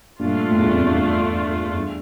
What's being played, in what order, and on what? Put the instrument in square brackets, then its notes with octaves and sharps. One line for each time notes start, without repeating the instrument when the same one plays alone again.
[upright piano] G2 A#2 [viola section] A3 D4 F4
[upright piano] A2
E2 G2
F2
E2 G2
E2 G2